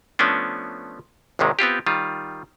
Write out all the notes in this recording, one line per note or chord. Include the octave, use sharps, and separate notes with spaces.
F3 A3 B3 C#4 D4
G#1 D#2 C3 D#3 G#3
B3 C4 F4 G4
D#3 G3 F4